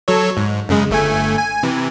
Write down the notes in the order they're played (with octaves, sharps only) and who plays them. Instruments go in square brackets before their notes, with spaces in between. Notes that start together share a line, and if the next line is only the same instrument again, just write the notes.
[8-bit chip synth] F#3 A4 C#5
G#2
F#2 C#3 G#3
G1 A3 G#5
G#5
C3 E3